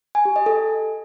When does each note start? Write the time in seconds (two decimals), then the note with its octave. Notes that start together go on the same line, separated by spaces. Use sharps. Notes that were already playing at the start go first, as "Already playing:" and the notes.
0.15 G#5
0.25 G4
0.36 D#5
0.46 A4